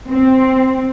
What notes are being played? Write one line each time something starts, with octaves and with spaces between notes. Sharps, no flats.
C4